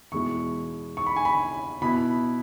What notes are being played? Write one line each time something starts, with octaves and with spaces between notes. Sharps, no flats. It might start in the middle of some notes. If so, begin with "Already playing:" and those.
E2 B2 G#3 E4 C#6
C#6
B5
G#5
B5
B2 B3 E4 B5